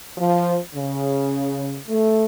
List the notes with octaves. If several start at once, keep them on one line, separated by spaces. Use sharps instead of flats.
F3
C#3
A3